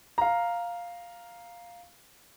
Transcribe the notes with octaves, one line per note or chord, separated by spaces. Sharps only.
F5 A#5